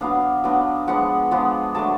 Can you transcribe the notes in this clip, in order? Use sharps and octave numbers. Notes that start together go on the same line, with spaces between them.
F#3 B3 D4 F5
F#3 B3 D4
F3 G#3 B3 D4 F#5
F3 G#3 B3 D4
F#3 A3 D4 A5